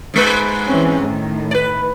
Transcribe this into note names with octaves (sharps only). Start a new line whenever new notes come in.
G#2 G#3 B4
E3 C4 C#4
A2 D#3
B4 D5